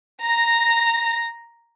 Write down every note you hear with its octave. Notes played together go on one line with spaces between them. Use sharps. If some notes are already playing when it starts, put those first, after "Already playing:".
A#5 A#6